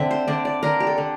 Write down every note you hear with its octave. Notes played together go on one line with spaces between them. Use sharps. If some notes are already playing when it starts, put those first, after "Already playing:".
Already playing: D3 C4 E5 G5
C5
D3 D5
D5
D3 A#4
G4
A4
D3